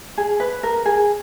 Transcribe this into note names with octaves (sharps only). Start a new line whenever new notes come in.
G#4
B4
A#4
G#4